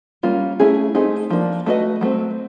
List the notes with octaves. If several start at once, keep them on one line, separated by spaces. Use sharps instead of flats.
G3 A#3 C#4 F4
A3 C#4 E4 G#4
A3 C4 D#4 G#4
F3 A#3 D4
A3 D4 F#4 B4 D#5
F#3 A3 C4